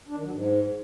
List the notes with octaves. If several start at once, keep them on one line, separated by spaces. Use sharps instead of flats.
D4
D#3
F#3
G#2